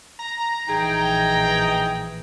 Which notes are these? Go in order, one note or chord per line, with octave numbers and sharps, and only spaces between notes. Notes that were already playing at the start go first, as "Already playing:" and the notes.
A#5
A#1 E3 D#4 G#4 G5